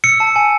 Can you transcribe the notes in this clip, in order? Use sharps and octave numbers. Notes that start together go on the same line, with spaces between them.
E6 C#7
A5
G#5